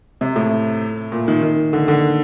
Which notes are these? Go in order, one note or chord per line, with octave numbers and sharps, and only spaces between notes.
C3
A2
A#2
D#3
D#3
D3
D3